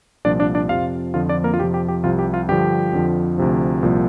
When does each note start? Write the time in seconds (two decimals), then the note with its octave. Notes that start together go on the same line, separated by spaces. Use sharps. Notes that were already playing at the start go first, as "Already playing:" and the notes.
0.25 C2 A#2 F3 D4 D5
0.40 D4 D5
0.55 D4 D5
0.69 F2 C3 F3 F4 F5
1.14 F2 D3 F3 F4 F5
1.29 D4 D5
1.44 A#3 A#4
1.54 F4
1.59 F2 C3 F3 G4
1.74 G4
1.88 G4
2.04 C2 C3 F3 F4
2.19 G4
2.34 F4
2.49 G2 D3 F3 G4
2.93 F2 D3 F3
3.38 D2 C3 F3
3.83 C2 A#2 F3